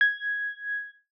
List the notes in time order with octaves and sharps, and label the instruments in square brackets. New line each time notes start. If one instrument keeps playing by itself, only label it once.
[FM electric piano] G#6